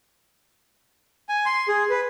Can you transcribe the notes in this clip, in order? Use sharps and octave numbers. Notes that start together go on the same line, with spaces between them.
G#5
C6
G#4
B4